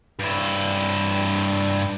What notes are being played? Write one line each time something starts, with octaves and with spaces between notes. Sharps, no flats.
G2 E4